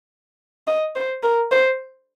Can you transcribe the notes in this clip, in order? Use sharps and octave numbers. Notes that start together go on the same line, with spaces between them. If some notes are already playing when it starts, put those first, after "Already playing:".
D#5
C5
A#4
C5